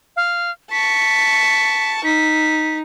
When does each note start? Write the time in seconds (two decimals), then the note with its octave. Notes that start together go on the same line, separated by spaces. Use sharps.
0.16 F5
0.71 A5 C#6 B6
2.04 D#4 B6